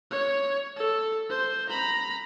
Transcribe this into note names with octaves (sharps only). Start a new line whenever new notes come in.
C#5
A4
C5
A#5 B5